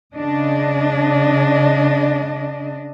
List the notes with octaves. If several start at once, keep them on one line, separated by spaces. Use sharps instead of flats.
C#3 D4 D#5